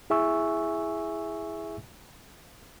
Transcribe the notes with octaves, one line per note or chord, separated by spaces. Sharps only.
E4 G#4 E5 G#5 C#6 E6